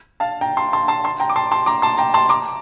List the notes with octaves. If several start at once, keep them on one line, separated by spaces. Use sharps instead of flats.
F5 A5
G5 A#5
A5 C6
A5 C6
A5 C6
A5 C6
G5 A#5
D6
A5 C6
A5 C6
A#5 D6
A5 C6
G5 A#5
A5 C6
A#5 D6